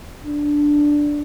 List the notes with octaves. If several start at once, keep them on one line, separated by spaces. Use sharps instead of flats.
D4